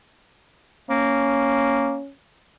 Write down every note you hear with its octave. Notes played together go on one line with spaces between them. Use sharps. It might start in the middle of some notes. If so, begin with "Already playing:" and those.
A#3 C#4